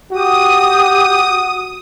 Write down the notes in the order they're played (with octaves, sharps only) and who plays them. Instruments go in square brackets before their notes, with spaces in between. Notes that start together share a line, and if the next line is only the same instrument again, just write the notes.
[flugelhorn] F#4 [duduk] G4 [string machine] D#6